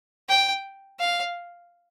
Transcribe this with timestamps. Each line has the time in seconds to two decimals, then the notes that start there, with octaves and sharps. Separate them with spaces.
0.29 G5
1.00 F5